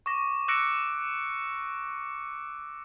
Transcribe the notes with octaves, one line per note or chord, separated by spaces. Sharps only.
C#6 D6 A#6
D6 E6 F#6 A#6 C#7 D7